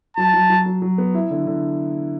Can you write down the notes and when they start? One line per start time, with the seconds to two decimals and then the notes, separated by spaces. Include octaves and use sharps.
0.17 F#3 A5
0.34 F#3
0.50 F#3
0.66 F#3
0.82 F#3
0.98 B3
1.14 E4
1.31 D3
1.47 D3